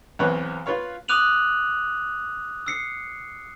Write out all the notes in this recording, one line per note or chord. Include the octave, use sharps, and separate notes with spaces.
B1 E2 C4 B4 C#5 F#6
F4 B4 C#5 F5
D6 D#6 F#6 D#7 F7 F#7
E6 C7 C#7